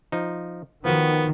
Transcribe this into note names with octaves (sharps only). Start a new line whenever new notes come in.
F3 D#4
D#3 F3 B3 F#4